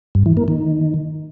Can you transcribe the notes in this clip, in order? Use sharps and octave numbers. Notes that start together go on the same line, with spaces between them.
G2
E3
A#3
D#3